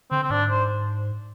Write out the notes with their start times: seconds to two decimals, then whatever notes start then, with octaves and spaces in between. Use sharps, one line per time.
0.11 D3 C4
0.23 C4
0.30 G#2 D4
0.50 C5